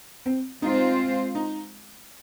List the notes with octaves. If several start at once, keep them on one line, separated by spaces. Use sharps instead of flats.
C4
G#3 C4 D#4 F4 C5
D#4